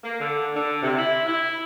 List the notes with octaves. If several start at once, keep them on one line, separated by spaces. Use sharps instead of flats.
A#3
D3
D3
C3
E4
E4